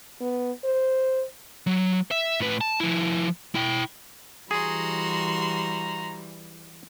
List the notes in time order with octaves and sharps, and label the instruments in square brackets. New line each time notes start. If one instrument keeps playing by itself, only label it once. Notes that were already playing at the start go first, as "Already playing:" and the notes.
[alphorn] B3
C5
[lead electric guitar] F#3
E5
A2 B4
A5
F3 E4
E4 G5
[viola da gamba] E3 G3 [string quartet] F#4 C6 [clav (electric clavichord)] G#4 [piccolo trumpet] A#5